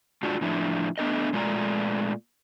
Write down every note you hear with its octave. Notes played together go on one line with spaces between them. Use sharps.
G#2 D4 F4 F#4
A2 F3 D4 E4
A3 B3 D4 A#4 D#5
A#2 G#3 A3 F4 D5 A#5